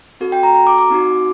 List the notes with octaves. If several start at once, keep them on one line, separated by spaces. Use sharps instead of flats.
C4 F#4 A4
G5
A#5
A#5
D6
D6
C4 D#4 F#4